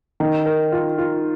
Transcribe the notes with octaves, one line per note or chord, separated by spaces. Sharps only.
D#3
A#4
F4
F4